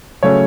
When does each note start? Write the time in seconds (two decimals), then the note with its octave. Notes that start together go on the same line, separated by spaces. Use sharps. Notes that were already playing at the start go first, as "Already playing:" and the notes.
0.23 C#3 F#3 A3 C#4 C#5